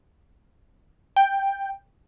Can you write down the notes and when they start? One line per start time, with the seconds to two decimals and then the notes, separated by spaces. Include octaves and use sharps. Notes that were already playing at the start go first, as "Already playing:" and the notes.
1.16 G5